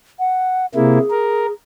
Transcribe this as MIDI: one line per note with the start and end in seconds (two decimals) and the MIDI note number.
0.19 0.66 78
0.75 0.99 48
0.75 0.99 58
0.75 0.99 64
0.75 1.52 68
1.11 1.46 70